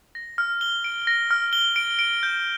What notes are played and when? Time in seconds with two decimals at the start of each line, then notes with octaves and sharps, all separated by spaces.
0.15 A#6
0.38 F6
0.61 G7
0.84 D7
1.07 A#6
1.31 F6
1.53 G7
1.76 D7
1.99 D7
2.23 G6